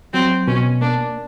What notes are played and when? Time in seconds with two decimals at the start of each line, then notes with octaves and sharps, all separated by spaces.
0.13 F#3 C4
0.47 B2 C#4
0.81 A#3 D4